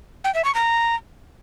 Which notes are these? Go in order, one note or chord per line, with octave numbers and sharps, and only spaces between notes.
G5
E5
C#6
A#5